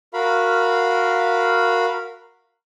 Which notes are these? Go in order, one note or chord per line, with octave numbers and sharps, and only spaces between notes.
F#4 A#4 F5 B5